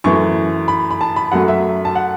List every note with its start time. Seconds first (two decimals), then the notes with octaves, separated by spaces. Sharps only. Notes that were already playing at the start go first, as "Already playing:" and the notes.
0.04 F#2 E3 A3 C#6
0.68 B5
0.91 B5
1.01 A5
1.16 B5
1.32 F#2 F#3 A3 F#5
1.48 E5
1.85 A5
1.95 F#5